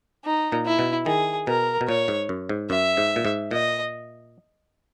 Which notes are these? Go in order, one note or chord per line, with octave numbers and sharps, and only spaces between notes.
D#4
A#2
E4
B2
D#3 G#4
B2 A#4
B2
A#2 C#5
G#2
F#2
G#2
F#2 E5
G#2
A#2
G#2
A#2 D#5